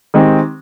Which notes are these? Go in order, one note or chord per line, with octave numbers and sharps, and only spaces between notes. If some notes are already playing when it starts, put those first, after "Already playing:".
D#3 G#3 C4 G4